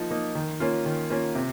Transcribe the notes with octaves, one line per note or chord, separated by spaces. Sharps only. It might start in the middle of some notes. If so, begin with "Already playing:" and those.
Already playing: F3 A#3 D#4
A#3 D#4
D#3
A#3 C#4 F4
D#3
A#3 C#4 F4
C3